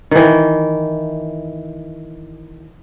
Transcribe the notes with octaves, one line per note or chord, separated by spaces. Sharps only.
D#3 E3